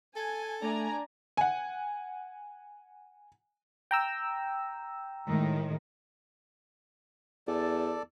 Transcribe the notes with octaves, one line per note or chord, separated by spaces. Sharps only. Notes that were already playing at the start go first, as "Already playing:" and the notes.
A4 G#5
A3 D4 D5 G#5 A#5
F#5 G#5
G5 A#5 E6
A2 D#3 G#3
E2 A4 D5